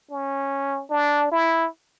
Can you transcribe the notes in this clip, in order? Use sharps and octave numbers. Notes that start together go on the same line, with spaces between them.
C#4
D4
E4